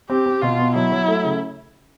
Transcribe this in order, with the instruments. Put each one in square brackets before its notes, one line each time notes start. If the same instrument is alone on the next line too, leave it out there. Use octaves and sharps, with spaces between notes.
[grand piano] C4 [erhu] G4
[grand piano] C4
[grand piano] B2 [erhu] F4
[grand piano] B3
[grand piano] F#3 [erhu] E4
[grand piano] F#3
A3
C#3